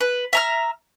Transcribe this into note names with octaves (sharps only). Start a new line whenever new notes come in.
B4
E5 A#5 F6